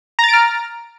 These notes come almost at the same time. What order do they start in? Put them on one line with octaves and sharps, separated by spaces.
A#5 A6 D7 F6